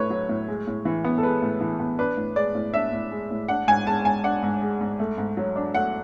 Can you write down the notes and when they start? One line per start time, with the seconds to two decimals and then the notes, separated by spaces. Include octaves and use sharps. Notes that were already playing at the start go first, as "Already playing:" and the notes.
Already playing: A2 A3 B4 C#5
0.10 F#3
0.29 A2
0.48 G#3
0.67 A2
0.85 E3
1.04 B3
1.18 A4
1.23 G#3 B4
1.42 A2
1.61 E3
1.80 B3
1.99 D4 B4
2.17 A2
2.36 G#3 D5
2.55 A2
2.74 D4 E5
2.93 A2
3.11 G#3
3.31 A2
3.48 D4 F#5
3.68 G#2 G#5
3.86 G#3 A5
4.05 G#2 G#5
4.24 D4 F#5
4.43 G#2
4.62 G#3
4.81 G#2
4.99 A3
5.18 G#2
5.37 F#3
5.56 D4
5.74 A3 F#5